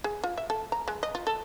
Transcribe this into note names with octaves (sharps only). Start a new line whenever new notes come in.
G#4
F4
E5
A4
A#5
G#3
D#5
F4
A4